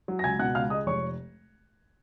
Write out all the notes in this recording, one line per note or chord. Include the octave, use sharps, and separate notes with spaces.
F#3
A#6
C#2 G#5 G#6
B2 F#5 F#6
C#2 F5 F6
G#3 D#5 D#6
F1 C#5 C#6